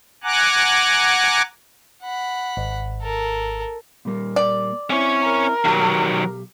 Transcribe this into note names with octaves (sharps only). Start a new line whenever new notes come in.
F#5 G#5 A#5 D6 F#6
F#5 B5
G#1
A4 A#4
A#2 G3 A#3
D5
C4 C#4 E4 C#5
A#4
B1 D#3 F#3 G4 F5